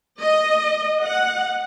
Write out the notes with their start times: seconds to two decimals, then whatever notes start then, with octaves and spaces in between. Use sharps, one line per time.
0.21 D#5
1.02 F#5